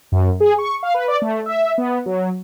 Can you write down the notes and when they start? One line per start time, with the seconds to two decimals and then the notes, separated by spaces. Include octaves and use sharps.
0.12 F#2
0.40 G#4
0.58 C#6
0.83 F5
0.94 B4
1.08 D5
1.22 A3
1.46 E5
1.78 B3
2.06 F#3